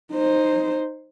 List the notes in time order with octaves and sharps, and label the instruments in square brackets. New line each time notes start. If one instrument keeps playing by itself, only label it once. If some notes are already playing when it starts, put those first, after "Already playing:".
[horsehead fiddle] D#4 C5